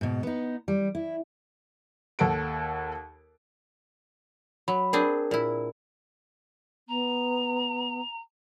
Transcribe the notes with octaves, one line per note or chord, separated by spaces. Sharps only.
G#2 B2
B3 D#4
G3
E4
D#2 A4 F#5 D7
F#3 B5
C4 D4 G#4 A#4
A#2 E4
B3 A#5